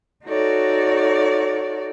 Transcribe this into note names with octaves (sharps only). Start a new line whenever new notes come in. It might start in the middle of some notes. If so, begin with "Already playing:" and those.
D#4 F#4 A4 C#5 D5